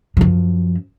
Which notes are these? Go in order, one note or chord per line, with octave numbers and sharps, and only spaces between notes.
F#2 F3